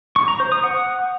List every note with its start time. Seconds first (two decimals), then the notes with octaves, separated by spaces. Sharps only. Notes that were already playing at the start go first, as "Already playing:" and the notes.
0.16 C#6
0.28 A#5
0.40 C5
0.52 D#6
0.64 F#5